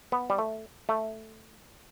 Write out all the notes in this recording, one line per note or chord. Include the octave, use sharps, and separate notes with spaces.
B3
G3
A3
A3